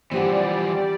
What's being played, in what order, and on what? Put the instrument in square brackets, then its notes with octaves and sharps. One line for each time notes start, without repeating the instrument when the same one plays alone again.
[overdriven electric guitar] E3 F3 [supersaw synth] G3 D5 [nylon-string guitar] C4 G4 F#5